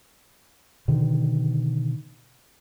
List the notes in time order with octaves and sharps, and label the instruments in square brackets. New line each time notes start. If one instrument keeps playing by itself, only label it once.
[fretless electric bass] B2 D3 D#3